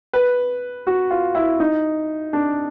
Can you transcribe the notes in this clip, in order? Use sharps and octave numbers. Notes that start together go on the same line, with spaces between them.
B4
F#4
F4
E4
D#4
D4